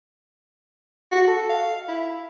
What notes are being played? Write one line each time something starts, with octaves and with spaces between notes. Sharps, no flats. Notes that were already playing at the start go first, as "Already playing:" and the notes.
F#4
A4
F5
E4